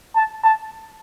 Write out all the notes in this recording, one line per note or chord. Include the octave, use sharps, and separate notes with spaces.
A5
A5